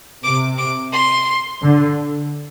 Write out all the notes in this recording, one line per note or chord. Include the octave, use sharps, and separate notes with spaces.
C3 D6
D6
C6
D3